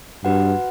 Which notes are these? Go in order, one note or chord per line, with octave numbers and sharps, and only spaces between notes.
G2 F#4 B4 F#5